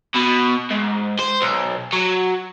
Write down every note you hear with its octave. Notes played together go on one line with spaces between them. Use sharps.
B2
G#2
C5
B1
F#3